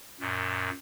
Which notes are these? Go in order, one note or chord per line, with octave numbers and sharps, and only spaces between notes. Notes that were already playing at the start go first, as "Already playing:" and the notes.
F#2 A#2